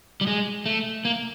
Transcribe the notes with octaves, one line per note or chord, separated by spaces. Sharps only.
G3
G#3
A3
A#3